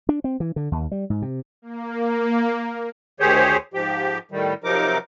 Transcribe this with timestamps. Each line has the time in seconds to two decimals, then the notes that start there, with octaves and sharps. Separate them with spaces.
0.09 D4
0.24 C4
0.40 E3
0.56 D3
0.72 D#2
0.92 G3
1.10 G#2
1.22 C3
1.62 A#3
3.20 D2 D#3 G4 G#4 C5 C#5
3.74 G#2 F3 G4
4.31 A2 D#3 G3
4.64 C3 F3 F#3 D#4 A#4 D6